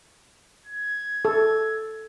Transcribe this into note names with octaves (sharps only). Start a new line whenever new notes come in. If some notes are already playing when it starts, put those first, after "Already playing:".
G#6
A4